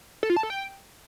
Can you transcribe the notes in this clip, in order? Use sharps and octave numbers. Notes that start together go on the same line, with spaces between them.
A4
F4
A5
A4
G5